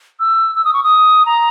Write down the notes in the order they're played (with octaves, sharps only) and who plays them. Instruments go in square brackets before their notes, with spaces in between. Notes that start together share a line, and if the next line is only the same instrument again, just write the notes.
[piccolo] E6
E6
D#6
C#6
D#6
A#5